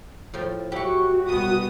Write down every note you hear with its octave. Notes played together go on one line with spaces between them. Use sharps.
A2 F3 G5
F#3 E4 F#4 G4 C#6
C2 B2 B3 D#6